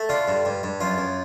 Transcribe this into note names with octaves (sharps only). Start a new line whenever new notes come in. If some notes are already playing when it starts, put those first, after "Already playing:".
Already playing: A3
D3 F4
G2
G2
G2
F#2 F4
F#2